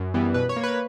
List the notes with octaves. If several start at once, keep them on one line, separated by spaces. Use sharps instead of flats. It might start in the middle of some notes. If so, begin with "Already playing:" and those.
Already playing: F#2
E3 G3 B3
B2 B4
C#5
A#3
B4